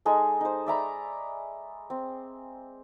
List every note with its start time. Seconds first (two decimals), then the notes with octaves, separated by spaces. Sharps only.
0.05 G#3 D#4 G#4 A4
0.41 D#4 C5
0.66 D5 E5 A#5 B5
1.90 C4